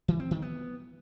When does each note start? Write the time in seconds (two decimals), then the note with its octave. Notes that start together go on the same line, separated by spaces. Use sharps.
0.08 E3
0.20 C4
0.31 D#3
0.42 B3